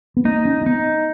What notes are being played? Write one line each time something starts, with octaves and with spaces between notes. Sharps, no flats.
B3
A#3 D#4
C#4
C#4
B3 D#4